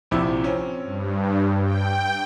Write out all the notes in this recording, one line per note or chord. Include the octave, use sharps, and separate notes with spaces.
A#1 C3 E4
C4 C#4
G2
G5